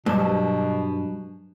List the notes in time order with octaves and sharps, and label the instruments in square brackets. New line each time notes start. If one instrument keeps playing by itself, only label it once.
[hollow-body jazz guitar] G2 [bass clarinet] B2 [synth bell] F#3 G3 E7